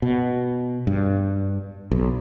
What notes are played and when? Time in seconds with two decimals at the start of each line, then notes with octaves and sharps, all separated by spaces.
0.02 B2
0.87 G2
1.91 B1